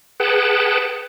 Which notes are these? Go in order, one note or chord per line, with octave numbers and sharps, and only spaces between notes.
G#4 B4 F#5 G5 A5